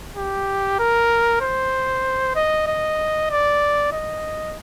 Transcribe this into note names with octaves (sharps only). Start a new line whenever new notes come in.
G4
A#4
C5
D#5
D#5
D5
D#5